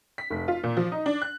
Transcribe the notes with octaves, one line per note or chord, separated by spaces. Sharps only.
B6
F1
F4
A#2
F3
D#4
D4
F#6